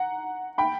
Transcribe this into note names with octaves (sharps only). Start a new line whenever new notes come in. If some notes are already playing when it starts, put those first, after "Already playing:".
Already playing: F#5 A#5
G5 B5